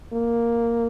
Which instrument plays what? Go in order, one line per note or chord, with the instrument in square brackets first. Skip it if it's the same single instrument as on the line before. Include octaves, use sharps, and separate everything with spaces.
[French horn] A#3